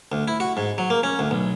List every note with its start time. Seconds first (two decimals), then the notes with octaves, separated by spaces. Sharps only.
0.12 D2
0.28 E4
0.40 F#4
0.57 G#2
0.78 F#3
0.90 A#3
1.03 C#4
1.19 D2
1.31 B1